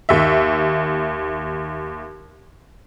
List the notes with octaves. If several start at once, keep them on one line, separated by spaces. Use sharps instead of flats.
D#2 E5